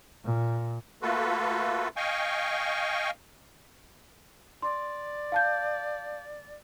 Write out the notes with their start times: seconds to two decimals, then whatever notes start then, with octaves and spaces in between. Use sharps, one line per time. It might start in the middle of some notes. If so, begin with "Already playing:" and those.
0.25 A#2
1.02 A3 A#3 F4 F#4 A4 B4
1.96 D#5 F5 G5 G#5 C#6
4.62 D5 C6
5.32 F5 A5 G6